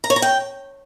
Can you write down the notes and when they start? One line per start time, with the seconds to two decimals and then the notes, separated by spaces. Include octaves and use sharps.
0.04 A#5
0.10 C#5
0.16 A#5
0.22 G5